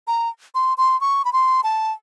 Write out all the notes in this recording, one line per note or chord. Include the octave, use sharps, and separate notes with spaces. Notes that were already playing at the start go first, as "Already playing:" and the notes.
A#5
C6
C6
C#6
B5
C6
A5